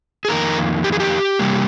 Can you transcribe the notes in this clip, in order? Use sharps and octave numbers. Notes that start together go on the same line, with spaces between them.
G#4
F2 C3 D#3 A#3 A#4
G4
G#4
G4
C3 G3 A#3